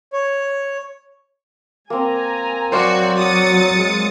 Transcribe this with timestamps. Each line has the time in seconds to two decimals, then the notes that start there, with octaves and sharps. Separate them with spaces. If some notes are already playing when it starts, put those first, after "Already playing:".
0.13 C#5
1.90 A#3 C4 G#5 A#5
2.72 F#3 F#4 C5 D5 F5
3.19 F#4 D#6 A6 C#7
3.77 G#3